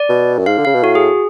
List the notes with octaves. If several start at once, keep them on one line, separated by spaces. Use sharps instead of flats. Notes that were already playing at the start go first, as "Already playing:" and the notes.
Already playing: D5
B2
F#2
G#2 F5
D3
C#3 F5
B2
A2 F#4
G#4